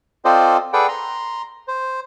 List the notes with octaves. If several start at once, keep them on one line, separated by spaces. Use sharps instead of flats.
C4 F4 A4 C5 D5 D#5
G#4 A4 B4 D5 F#5 G5
A#5 C6
C5